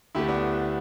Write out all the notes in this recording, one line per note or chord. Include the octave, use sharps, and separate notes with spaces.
D2 D3 A3 E4 G4
B3 D4